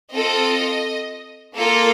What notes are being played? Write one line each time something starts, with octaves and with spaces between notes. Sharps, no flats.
C4 F4 A4 D#5
A#3 F4 A4